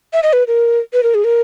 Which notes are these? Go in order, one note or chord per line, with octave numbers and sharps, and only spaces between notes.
E5
D#5
B4
A#4
B4
A#4
G#4
A#4